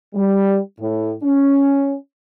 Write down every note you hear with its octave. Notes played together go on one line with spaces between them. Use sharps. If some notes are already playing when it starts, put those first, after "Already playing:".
G3
A2
C#4